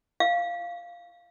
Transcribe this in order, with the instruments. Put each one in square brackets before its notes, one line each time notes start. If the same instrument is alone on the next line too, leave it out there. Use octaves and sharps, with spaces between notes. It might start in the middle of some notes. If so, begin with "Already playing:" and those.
[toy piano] F5